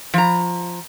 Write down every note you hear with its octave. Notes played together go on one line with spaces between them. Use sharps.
F3 A#5